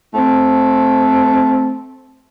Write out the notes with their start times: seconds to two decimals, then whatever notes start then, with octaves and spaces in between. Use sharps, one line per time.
0.15 A3 C4